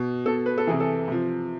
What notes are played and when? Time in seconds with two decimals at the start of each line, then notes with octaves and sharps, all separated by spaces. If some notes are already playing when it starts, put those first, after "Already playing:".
Already playing: B2
0.26 B2 A4
0.46 B4
0.58 A4
0.67 C3 E3 G#4
0.80 A4
1.08 C3 F3